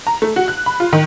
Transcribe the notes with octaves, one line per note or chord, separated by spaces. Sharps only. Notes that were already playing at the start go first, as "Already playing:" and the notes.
A#5
A3
F#4
F#6
B5
F4
D#3